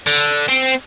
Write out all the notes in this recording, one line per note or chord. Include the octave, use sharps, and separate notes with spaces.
D3
C4